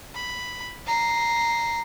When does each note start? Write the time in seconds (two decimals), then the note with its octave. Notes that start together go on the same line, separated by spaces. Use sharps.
0.15 B5
0.87 A#5 C7